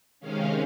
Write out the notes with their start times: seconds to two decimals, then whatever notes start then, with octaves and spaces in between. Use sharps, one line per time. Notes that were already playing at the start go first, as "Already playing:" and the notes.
0.20 C3 D#3 G#3 C#4 F5